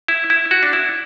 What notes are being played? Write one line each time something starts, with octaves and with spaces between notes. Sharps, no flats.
E4
E4
F#4
D4
E4